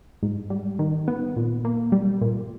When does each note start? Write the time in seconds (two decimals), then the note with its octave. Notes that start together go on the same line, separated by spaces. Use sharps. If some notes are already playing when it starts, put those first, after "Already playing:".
0.23 G#2
0.50 G3
0.79 D#3
1.08 B3
1.36 A#2
1.65 A#3
1.92 G3
2.21 A#2